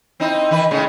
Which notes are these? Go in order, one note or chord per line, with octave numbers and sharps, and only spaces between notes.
C4 D#4 E4
D#3 E3 B4
A2 C#3 G#3